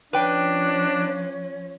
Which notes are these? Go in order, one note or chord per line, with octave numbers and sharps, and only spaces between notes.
F3 C#4 D4 B4 C#5 G5